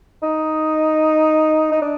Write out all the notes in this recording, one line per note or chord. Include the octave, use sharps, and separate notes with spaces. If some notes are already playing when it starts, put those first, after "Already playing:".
D#4
D#4
D4